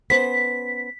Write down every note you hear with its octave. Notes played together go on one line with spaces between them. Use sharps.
B3 C#4 C5 B6